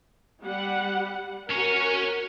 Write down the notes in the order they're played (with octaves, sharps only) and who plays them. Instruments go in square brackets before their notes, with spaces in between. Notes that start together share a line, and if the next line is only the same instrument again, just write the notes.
[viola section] G3 F#5
[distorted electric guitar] C#4 C#5 [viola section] F#4 A#4